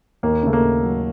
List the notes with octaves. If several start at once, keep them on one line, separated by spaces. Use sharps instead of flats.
D#2 A#3
C#3 A3
A#3
D#2
F#3